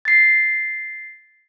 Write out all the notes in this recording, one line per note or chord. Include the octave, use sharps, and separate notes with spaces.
A6 C7